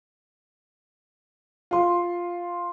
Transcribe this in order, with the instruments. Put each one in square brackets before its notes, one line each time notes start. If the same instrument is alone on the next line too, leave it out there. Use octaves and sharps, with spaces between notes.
[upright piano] F4 C6